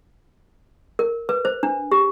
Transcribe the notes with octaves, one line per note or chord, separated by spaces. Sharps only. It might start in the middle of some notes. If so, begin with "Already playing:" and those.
A#4
B4
C5
D4
G4